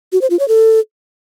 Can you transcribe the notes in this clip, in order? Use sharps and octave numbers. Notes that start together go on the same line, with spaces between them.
F#4
C5
F4
C#5
A4